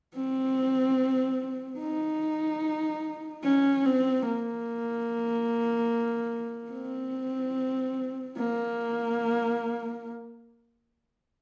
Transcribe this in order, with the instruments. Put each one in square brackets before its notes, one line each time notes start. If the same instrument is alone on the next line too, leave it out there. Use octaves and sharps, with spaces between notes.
[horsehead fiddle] C4
D#4
C#4
C4
A#3
C4
A#3